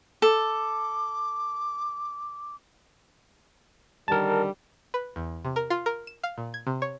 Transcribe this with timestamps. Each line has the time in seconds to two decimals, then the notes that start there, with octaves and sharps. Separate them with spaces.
0.22 A4 D6
4.08 D3 D#3 G3 A#4 A5
4.94 B4
5.16 E2
5.45 C3
5.56 A#4
5.70 F4
5.86 A#4
6.07 E7
6.23 F5
6.38 A#2
6.54 G#6
6.67 C3
6.82 C#5